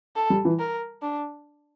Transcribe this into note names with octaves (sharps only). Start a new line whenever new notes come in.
A4
G3
E3
A#4
D4